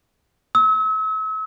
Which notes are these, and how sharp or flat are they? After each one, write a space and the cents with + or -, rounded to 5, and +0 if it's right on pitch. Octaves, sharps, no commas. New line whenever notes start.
E6 -40